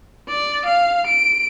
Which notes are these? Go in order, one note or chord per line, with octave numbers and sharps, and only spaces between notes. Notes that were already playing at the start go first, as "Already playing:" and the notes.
D5
F5
D7